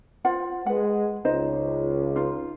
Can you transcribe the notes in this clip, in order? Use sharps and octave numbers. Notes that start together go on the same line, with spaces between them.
F4 C5 F#5
G#3 B4 F#5
C#2 D#4 C5 D#5
D#4 F4